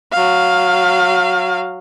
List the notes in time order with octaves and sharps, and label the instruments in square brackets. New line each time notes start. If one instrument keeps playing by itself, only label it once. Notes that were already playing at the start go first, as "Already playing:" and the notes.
[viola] F#3 F5